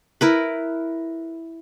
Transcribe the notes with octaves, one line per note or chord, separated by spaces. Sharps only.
E4 A#4 B4